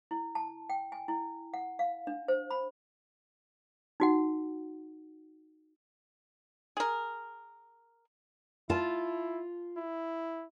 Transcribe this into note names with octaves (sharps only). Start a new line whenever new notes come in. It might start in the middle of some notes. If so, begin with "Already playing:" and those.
E4
A5
G5
G#5
E4
F#5
F5
D4
C5
B5
D#4 F#4 F#5
G#4 A#4
E4 F4 A5
E4